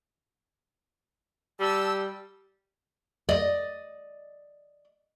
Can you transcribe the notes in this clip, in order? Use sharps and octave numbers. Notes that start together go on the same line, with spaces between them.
G3 A5 E6
D5 D#5